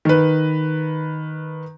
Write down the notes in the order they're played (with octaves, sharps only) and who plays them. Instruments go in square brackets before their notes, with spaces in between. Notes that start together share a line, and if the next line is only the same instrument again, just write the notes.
[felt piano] D#3 B4